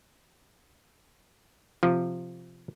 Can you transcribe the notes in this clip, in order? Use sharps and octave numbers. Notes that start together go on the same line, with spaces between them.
C3 F3